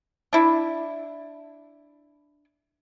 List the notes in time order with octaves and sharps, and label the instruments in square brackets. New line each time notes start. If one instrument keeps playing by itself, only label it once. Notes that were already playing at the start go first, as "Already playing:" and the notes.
[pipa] D4 E4